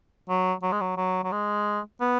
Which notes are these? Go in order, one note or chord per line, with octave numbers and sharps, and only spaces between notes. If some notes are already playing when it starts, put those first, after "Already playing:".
F#3
F#3
G#3
F#3
F#3
F#3
G#3
B3